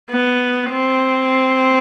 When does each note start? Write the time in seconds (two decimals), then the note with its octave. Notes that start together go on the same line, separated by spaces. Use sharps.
0.10 B3
0.70 C4